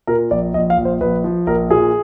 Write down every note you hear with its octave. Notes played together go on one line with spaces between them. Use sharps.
A#2 A#4
A#1 D5
A#1 D#5
F5
A#1
C5
A#1 B4
F3
A#1 A#4
A#2 G#4